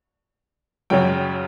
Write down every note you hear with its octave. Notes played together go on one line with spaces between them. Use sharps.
F#2 C#3 F#3 G5